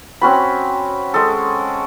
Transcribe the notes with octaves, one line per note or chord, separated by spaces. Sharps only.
C4 C#4 F#4 B5
G#3 A4